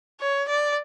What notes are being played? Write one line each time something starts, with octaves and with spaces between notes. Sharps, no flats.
C#5
D5